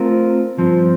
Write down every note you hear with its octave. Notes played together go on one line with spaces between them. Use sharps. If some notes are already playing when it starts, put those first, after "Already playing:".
Already playing: A3 C4 F4 A#4
G2 F3 C4